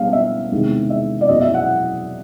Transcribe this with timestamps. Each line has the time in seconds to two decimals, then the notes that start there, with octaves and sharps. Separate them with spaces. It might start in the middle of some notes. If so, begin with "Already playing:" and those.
Already playing: C#2 B2 G3 B3 D4 F5
0.13 E5
0.52 E2 C3 D#3 G#3
0.90 E5
1.21 D5
1.28 F#1 E2 B2 F#3 D#5
1.41 E5
1.54 F#5